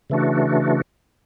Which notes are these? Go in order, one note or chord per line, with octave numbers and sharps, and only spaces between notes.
C#3 E3 A3 D4 F#4